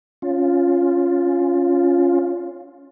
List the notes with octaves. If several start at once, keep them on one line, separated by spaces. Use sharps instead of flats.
C#4 F4